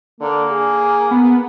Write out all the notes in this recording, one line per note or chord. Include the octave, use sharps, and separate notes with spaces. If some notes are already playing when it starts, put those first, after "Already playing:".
D3 A#3
G#4
B3